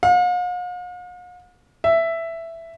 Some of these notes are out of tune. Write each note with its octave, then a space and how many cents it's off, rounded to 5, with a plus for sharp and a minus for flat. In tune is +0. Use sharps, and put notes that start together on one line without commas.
F5 +45
E5 +5